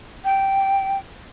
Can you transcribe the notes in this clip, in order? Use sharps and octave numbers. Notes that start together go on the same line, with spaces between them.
G5